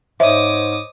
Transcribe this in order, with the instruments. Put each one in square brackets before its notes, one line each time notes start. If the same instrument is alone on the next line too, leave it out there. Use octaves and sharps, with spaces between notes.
[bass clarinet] G#2 [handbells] C5 C#5 D#5 [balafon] E5 [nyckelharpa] D6 D#6